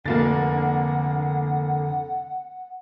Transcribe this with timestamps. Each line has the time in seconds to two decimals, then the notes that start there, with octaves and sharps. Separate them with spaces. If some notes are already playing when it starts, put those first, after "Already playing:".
0.06 F1 D3 A#3 F#5 A6